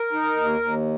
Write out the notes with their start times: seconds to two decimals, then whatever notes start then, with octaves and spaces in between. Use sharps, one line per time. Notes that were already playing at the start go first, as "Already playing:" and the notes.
Already playing: A#4
0.13 D#4
0.36 D#2
0.60 D#2